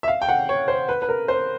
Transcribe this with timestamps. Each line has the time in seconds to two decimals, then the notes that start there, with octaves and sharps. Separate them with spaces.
0.03 E5
0.08 F5
0.22 G5
0.29 F#5
0.49 C#5
0.68 C5
0.89 B4
1.02 B4
1.09 A#4
1.28 C5